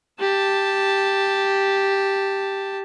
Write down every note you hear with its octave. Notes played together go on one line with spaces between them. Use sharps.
G4 A5